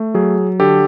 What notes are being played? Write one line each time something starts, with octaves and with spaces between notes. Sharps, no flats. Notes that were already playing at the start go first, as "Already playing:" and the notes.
Already playing: A3
F#3 G#4
D3 G4 A4